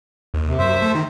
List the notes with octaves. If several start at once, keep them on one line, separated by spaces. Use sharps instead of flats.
D#2
C3
F#2 C5 E5
A3
D#3